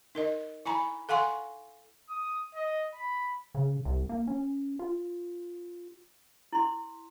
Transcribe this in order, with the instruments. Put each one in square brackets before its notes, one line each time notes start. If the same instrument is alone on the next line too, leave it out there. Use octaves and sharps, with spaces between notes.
[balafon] D#4 A#4 D#5
E4 G#5 A#5 B5
A4 F5 F#5 G#5 C6 C#6
[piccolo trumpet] D#6
D#5
B5
[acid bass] C#3
C2
A#3
C#4
F4
[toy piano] E4 C6